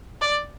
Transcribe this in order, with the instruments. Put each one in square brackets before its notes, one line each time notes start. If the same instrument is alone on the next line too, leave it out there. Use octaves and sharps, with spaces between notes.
[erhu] D5